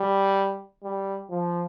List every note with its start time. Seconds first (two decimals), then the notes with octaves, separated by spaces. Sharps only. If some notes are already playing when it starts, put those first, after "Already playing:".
Already playing: G3
0.83 G3
1.30 F3